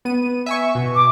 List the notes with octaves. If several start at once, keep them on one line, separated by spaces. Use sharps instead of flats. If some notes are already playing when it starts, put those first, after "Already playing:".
B3 D#7
E5 G#5 C#6
B2
D6